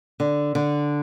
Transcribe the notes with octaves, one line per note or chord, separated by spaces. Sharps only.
D3
D3